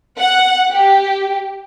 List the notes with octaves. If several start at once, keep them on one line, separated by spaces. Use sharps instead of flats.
F#5
G4